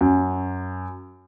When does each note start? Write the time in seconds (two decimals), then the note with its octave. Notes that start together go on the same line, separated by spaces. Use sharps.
0.01 F#2